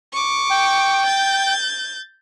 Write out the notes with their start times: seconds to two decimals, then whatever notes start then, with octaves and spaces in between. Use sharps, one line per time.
0.13 C#6 D6
0.50 G5
1.05 G6 A6